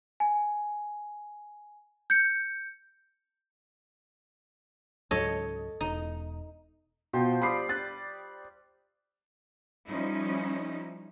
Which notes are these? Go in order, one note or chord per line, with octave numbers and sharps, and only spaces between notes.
G#5
G6 C#7
C#2 G#2 F#3 A4 C#5 D#5
E1 D#4
B2 F3 C5 G5
G3 D5 B5 D#6 C7
F#6 A6
F3 G3 C#4 D#4 E4